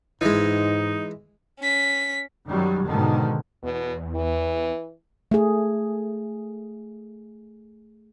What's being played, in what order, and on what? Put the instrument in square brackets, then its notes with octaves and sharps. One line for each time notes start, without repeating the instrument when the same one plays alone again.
[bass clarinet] G#2 [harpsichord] E3 G#3 [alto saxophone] D#4
[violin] C#4 B6
[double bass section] F#2 D#3 F#3 G3
G#2 B2 D3 D#3
[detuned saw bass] E2 [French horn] B2
[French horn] E3
[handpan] A3 G#4